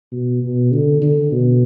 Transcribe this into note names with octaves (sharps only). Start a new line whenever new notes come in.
B2
B2
D3
D3
B2